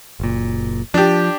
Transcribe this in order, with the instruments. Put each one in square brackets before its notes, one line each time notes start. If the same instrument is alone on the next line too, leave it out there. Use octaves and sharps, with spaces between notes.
[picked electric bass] F#1 A#2
[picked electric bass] F3 [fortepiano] D4 G4